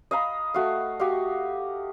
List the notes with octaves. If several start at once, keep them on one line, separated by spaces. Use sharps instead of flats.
D#5 F5 A#5 B5
A3 F#4 F5
F#4 G4 D#5 F5